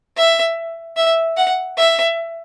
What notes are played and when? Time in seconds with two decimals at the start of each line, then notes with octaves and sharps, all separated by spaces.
0.17 E5
0.97 E5
1.37 F#5
1.78 E5